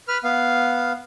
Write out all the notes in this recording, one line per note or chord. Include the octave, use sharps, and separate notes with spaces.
B4 F6
B3 F5